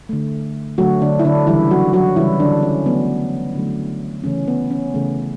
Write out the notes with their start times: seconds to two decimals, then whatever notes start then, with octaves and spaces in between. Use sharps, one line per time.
0.09 D3 A3
0.78 D3 F#3 A3 F#4
1.02 D3 D4
1.20 E4
1.25 D3 D4
1.47 C#3 E3 G3 E4
1.70 F#3 F#4
1.93 F#3 F#4
2.16 C#3 E3 G3 E4
2.40 D3 D4
2.63 C#4
2.85 D3 F#3 A3 B3
3.55 D3 F#3 A3
4.24 C#3 E3 A3 C#4
4.48 B3
4.70 C#4
4.94 C#3 E3 A3